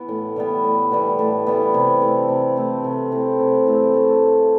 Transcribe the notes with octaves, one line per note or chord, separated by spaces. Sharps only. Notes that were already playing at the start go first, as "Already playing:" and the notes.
Already playing: E3 B3
A2
E3 G3 B3
A2
E3 G3 B3
A2
E3 G3 B3
C3
E3 A3 C4
C3
E3 A3 C4
C3
E3 A3 C4
C3
E3 A3 C4
A3